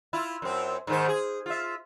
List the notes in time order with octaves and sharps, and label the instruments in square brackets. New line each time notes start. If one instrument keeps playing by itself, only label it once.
[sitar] E4 F4
F#2 C4
G#2 D#3 C5
G#4
F4 E5